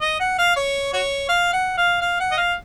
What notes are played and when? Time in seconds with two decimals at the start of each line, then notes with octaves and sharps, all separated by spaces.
0.01 D#5
0.20 F#5
0.39 F5
0.56 C#5
0.93 F#4 C#5
1.29 F5
1.53 F#5
1.78 F5
2.01 F5
2.20 F#5
2.31 D#5
2.38 F5